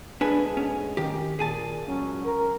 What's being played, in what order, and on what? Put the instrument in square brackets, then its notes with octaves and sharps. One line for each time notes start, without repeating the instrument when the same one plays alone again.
[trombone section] D2 G#2 G#4 [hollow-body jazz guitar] D4 B4 G#5
[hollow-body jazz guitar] C#4
D#3 G4
[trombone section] A#2 [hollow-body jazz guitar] G#4 G#5 A5
[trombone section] C#2 F#3 C#4
A#4